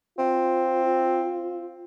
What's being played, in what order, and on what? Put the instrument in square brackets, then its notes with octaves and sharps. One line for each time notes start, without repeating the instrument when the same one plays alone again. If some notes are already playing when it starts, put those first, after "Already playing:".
[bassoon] C4 [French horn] F4